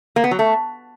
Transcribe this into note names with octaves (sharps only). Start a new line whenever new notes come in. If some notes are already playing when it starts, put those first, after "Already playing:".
A#3
B3
F#3
A3